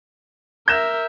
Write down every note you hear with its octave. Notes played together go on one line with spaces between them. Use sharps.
A#4 E5 G6 A#6 E7